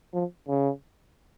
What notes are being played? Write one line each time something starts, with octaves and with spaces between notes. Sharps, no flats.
F3
C#3